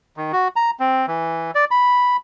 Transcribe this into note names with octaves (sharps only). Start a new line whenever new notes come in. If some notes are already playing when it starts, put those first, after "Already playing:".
D#3
F#4
A#5
C4
E3
D5
B5